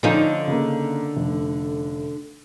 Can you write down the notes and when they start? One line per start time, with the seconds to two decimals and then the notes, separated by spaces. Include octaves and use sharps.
0.03 D3 F3 C#4 D#4 G6 D#7
0.48 C#3 A#3
1.17 F1